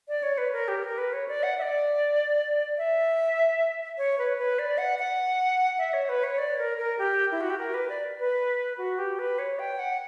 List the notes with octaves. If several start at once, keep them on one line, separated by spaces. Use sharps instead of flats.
D5
C#5
B4
A#4
G4
A#4
B4
C#5
D5
F#5
E5
D5
E5
C#5
B4
B4
D5
F#5
F#5
E5
C#5
B4
C#5
D5
A#4
A#4
G4
E4
F#4
G4
A#4
B4
D5
B4
F#4
G4
B4
C#5
G5
F#5